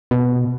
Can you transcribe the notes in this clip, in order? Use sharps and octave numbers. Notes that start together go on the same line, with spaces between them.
B2